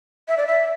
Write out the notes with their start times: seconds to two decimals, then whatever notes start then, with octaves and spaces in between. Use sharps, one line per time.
0.28 E5
0.37 D5
0.47 E5